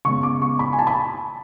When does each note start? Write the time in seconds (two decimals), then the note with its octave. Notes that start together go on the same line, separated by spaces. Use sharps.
0.05 C#3 G#3 B3 C#6
0.23 D6
0.42 C#6
0.59 B5
0.73 G#5
0.79 A5
0.87 B5